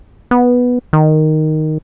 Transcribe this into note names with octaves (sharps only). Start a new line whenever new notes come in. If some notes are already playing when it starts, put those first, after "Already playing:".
B3
D#3